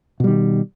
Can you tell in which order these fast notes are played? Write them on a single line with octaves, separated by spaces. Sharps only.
B2 G3 D#3